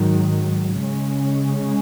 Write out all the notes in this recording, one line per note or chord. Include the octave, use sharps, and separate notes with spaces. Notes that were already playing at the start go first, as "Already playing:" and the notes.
Already playing: G#2 D#3 F#3
C#3 G#3 C#4